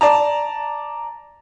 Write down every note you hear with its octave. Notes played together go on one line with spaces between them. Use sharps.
D5 A5 A#5